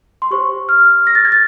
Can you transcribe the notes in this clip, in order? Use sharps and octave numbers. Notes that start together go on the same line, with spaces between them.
C6
G4 C5 C#6
F6
A#6
A6
G#6
A6